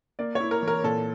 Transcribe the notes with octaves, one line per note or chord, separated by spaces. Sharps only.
A#3 D5
E4 C#5
A#4
E3 A#4
A#2 A4